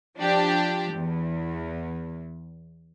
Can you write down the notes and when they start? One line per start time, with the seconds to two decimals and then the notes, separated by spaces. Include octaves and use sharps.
0.18 F3 D4 G4
0.93 E2